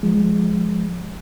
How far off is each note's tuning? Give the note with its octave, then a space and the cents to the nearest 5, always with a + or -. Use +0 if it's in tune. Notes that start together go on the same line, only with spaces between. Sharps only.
F3 +0 G#3 +0